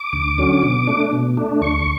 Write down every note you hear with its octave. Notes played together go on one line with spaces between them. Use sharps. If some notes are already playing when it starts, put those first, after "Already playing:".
Already playing: D6
D2
D3 F#3 C#4
B2
A3 D4
B2
A3 D4
D2 C#6